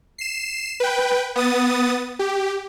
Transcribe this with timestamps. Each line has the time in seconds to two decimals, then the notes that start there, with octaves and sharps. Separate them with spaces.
0.18 C7 E7
0.80 B4 G5
1.35 B3 D#6 A6
2.19 G4